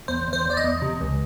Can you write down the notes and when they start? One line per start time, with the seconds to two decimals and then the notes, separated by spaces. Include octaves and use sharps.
0.08 E2 C5
0.27 E2
0.33 C5
0.45 E2 D5
0.57 D#5
0.64 E2
0.82 C3
1.01 C#2